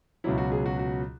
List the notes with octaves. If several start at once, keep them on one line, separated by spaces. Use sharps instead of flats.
C#2 B2 F#3 E4
F#4
G#4
F#4
F#4